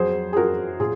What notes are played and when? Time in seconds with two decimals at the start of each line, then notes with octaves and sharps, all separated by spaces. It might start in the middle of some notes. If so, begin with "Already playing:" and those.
Already playing: F2 F#3 G#4 C5
0.33 G#4
0.36 F#2 F#4 A#4
0.80 A#2 F4 G#4